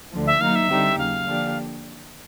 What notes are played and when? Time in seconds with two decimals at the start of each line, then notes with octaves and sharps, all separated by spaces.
0.12 D2 D3 F3
0.27 E5
0.41 D#3 F#3 A#3 D#4 F5
0.55 E5
0.70 D3 G3 C4 D#4 G4
0.98 D#2 C#3 F#3 F5
1.26 D3 F3 A#3 D4 G4